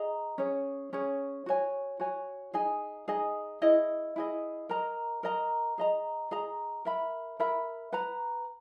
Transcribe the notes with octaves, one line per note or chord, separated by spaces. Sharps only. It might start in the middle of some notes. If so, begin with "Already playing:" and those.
Already playing: G#4 D#5 A#5
C#4 G#4 C#5
C#4 G#4 C#5
F#4 C#5 G#5
F#4 C#5 G#5
D#4 G#4 D#5 G#5
D#4 G#4 D#5 G#5
E4 G#4 D#5
E4 G#4 D#5
A#4 D#5 A#5
A#4 D#5 A#5
G#4 D#5 A#5
G#4 D#5 A#5
A#4 E5 B5
A#4 E5 B5
B4 F#5 A#5